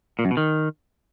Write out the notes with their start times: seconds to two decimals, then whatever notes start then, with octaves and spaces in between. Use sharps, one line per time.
0.19 A#2
0.25 F#2
0.31 B2
0.37 D#3